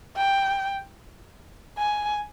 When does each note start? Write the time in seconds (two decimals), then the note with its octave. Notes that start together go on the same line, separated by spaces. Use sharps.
0.17 G5
1.78 G#5